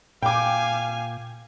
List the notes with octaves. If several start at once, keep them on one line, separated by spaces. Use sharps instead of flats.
A#2 F5 G5 G#5 D6